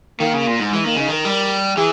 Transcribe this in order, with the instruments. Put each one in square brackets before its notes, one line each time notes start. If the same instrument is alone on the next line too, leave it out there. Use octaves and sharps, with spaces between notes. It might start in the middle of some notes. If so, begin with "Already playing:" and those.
[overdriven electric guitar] D#3 [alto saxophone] A#3
[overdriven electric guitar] C#3
A#2
G#2
[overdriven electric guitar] E3 [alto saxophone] G#3
[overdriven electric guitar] D#3 [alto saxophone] A#3
[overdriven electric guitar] C#3 [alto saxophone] D#4
[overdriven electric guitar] D#3 [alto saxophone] A#4
[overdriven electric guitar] G3
[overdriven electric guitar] E3 [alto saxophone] G#4